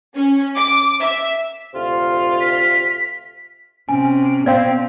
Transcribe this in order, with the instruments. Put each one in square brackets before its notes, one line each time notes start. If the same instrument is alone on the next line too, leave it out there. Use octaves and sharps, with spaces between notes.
[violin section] C#4
D6
E5
[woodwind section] D2 C3 F4
[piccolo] B6
[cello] C3 [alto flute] C#4 [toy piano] G#5
[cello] B2 [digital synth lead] C4 [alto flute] C5 [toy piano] D5 F5